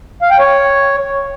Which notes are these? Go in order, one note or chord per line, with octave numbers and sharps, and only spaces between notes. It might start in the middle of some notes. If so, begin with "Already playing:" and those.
F5
G5
C#5